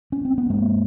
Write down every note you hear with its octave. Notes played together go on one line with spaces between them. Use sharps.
C#4
C4
B3
G2 G#3 A#3